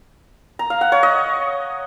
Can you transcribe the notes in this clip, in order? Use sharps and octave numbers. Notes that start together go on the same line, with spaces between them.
A#5
F5
F#5
C#5
D#5